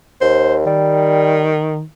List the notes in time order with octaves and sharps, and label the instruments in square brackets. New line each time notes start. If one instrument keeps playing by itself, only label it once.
[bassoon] D#2 [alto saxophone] C5
[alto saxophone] D#3 [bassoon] G3